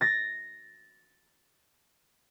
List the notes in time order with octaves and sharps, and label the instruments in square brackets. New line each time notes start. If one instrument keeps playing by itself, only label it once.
[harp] A6 A#6